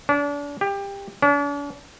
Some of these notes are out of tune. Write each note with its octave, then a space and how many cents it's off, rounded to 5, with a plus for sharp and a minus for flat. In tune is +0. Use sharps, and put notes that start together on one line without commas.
D4 -35
G4 +25
D4 -45